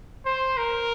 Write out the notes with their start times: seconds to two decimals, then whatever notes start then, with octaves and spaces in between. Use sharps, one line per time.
0.25 C5
0.57 A#4